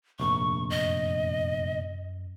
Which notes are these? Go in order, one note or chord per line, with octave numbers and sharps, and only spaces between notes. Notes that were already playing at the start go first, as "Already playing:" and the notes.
F1 A#1 G2 C#6
F#2 D#5